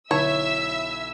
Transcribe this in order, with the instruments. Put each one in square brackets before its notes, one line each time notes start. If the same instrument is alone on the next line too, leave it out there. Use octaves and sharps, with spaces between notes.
[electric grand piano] B1 E4 [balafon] D3 D#4 A5 [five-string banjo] C#5 [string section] E5 E6